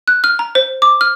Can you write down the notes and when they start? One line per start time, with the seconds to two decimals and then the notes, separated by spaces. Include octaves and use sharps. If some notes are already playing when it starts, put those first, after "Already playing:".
0.08 F#6
0.24 F6
0.39 A#5
0.55 C5
0.82 D6
1.01 F6